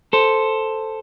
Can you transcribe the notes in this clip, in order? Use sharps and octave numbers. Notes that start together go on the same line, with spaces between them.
A4 C5